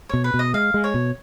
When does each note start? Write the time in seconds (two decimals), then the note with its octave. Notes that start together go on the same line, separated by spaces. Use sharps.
0.09 B2 C#5
0.24 B4
0.34 B2
0.39 D#5
0.54 G#3 F5
0.74 G#3
0.84 C#5
0.94 B2